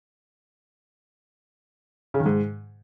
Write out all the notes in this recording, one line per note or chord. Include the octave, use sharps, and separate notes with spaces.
C#3
D#3
G#2